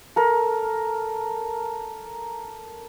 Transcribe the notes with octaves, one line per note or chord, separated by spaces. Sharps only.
A4 A#4